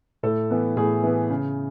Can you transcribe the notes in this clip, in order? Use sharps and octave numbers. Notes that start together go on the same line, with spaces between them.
A2 A4
E3 B3
A2 G#4
E3 B3
C#3